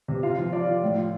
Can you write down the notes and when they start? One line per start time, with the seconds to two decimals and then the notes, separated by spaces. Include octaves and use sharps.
0.08 C3
0.23 F4 F5
0.37 F3
0.52 F3 D5
0.67 F3
0.82 A2
0.97 F4